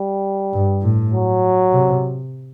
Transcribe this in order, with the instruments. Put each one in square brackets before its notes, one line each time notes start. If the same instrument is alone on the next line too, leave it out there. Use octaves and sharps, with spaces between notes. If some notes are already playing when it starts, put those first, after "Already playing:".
Already playing: [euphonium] G3
[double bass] G2
A2
[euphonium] F#3
[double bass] C3